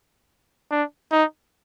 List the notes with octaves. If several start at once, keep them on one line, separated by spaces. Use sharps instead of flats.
D4
D#4